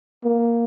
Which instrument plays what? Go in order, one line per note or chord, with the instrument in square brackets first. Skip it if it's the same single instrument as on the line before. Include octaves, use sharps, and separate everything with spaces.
[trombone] A#3